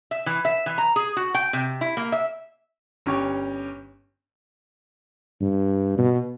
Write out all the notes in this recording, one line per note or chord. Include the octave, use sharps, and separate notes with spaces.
E5
E3
E5
E3
A#5
G#4
F#4
G5
C3
E4
A#3
E5
G1 C#4 G4 C#5
G2
B2